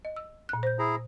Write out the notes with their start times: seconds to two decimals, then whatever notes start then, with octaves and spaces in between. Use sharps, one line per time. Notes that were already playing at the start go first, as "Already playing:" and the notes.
0.05 D#5
0.16 E6
0.49 A#2 F#6
0.63 C5 G6
0.79 E4 G#4 A#5